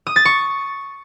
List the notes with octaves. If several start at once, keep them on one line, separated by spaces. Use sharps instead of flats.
D#6
A6
C#6